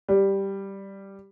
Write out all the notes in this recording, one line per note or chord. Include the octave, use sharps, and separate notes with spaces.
G3